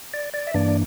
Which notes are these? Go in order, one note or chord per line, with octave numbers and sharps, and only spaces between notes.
D5
D5
E5
G2 E3 A#3 D4 D5